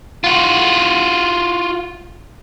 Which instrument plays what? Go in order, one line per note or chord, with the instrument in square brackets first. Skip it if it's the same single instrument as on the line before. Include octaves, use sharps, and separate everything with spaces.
[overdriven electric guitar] F4 F#4